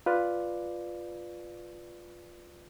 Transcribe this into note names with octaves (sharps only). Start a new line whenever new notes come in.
F4 B4 D5